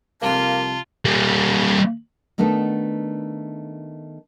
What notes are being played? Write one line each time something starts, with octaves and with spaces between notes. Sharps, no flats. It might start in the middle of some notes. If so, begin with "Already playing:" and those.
C2 F2 A#3 F4 A5
G3 A#3
D#3 A3 B3 D4 D#4 A4